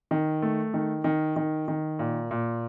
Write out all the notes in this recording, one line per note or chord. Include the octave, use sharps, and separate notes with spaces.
D#3
A3
D#3
D#3
D#3
D#3
A#2
A#2